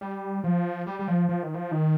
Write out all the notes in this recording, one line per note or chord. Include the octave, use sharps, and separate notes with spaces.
G3
F3
G3
G3
F3
F3
D#3
F3
D#3